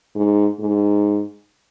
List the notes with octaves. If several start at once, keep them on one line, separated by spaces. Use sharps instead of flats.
G#2
G#2